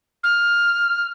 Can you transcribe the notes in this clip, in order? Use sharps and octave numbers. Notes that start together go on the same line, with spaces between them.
F6